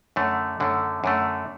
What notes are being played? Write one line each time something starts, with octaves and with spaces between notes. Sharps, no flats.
F#2 D3 A3
F#2 D3 A3
F#2 D3 A3